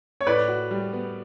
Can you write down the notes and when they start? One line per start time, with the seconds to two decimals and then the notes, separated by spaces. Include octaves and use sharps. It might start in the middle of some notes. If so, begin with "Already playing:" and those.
0.21 C#5
0.27 A2 B4 D5
0.48 F#4
0.71 G3
0.93 B3